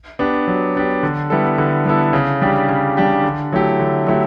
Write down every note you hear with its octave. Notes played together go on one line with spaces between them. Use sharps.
B3 D4 G4
F#3
B3 D4 G4
D3
G3 B3 E4 A4
D3
G3 B3 E4 A4
C#3
G3 D4 G4
C#3
G3 D4 G4
D3
F#3 A3 E4 G4
D3
F#3 A3 E4 G4